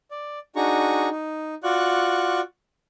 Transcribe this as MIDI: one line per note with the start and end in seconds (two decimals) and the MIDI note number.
0.11 0.39 74
0.56 1.09 62
0.56 1.09 63
0.56 1.09 66
0.56 1.09 68
0.56 1.09 82
0.56 1.09 85
1.11 1.55 63
1.64 2.41 65
1.64 2.41 66
1.64 2.41 74
1.64 2.41 85
1.64 2.41 90